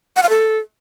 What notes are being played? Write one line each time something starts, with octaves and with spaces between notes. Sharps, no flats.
F#5
F5
A4